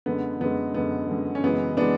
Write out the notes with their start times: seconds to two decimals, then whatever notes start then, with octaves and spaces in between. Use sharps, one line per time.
0.06 F#2 D3 G#3 B3
0.41 F#2 D3 G#3 B3
0.74 F#2 D3 G#3 B3
1.09 F#2 D3 G#3
1.35 C#4
1.44 F#2 C#3 E3 G#3 B3
1.77 C#3 E3 G#3 B3 D4